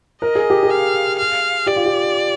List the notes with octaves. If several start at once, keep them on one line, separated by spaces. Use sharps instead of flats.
A#4 D#5
G#4
G4
G#4
F5
F5
G4 D5
F4
G4